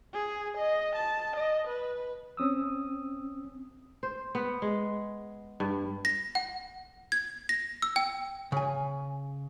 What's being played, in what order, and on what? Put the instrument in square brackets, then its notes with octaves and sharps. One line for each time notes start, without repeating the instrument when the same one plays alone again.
[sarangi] G#4
D#5
A5
D#5
B4
[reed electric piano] C4 C#4 D#6 E6
[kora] C5
B3
G#3
G2
[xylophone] A#6
F#5
G#6
A#6
E6
G5
[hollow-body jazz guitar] C#3 G#5